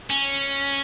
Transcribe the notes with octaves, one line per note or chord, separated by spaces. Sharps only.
C#4